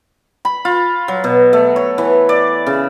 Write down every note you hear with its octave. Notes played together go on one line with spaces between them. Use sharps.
B5
F4
F#3
B2
A3
C#5
E3
D5
C#3